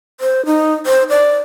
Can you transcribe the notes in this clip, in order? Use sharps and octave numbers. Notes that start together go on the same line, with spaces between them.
C5
D#4
C5
D5